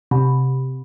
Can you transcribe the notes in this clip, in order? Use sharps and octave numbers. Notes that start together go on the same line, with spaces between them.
C3